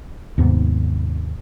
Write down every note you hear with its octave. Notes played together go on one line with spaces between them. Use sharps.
D#2 G#2 C3 B3